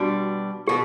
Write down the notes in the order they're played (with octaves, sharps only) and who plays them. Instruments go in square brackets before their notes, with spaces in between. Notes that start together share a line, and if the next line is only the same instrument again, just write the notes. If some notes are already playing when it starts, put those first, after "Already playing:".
Already playing: [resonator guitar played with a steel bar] B2 G3 D4 [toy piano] F#4
[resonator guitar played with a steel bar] B2 [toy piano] G4